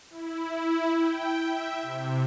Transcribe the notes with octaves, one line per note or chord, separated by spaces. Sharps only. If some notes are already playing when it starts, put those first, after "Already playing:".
E4
G5
E5
C3